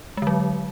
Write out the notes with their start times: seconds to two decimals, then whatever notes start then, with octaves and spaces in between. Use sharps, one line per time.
0.17 G#3
0.22 D3
0.27 F#3